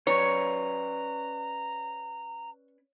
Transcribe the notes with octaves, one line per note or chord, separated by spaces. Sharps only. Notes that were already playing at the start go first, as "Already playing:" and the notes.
C#4 B4 C#5 D5 A#5